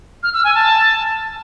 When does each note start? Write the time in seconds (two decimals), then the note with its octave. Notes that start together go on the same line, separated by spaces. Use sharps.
0.23 F6
0.34 E6
0.44 G#5
0.55 A5